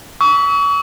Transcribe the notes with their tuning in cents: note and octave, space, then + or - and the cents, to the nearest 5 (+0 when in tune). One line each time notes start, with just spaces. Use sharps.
C#6 +35 E6 -35